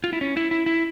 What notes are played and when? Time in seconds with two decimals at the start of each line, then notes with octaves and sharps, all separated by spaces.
0.04 F4
0.13 E4
0.21 C#4
0.37 E4
0.51 E4
0.66 E4